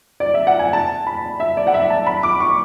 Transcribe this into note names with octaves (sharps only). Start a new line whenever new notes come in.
D5
E5
F#5
G#5
A5
B5
E5
D5
F#5
E5
A5
B5
D6
C#6